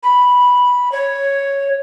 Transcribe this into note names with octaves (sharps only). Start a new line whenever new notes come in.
B5
C#5